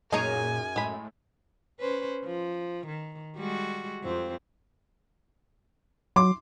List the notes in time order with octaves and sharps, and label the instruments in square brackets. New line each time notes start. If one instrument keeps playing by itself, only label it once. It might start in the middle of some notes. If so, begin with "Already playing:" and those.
[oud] F#2 G#4 C#5 [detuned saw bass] A#2 [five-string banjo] D#4 D#5 A#5 [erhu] G#5
[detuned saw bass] A2 [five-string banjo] G#3 B5
[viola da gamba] C#4 B4 C5
F3
D#3
G3 G#3 F#4
F2 C4
[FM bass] F#3 [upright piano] C6 D6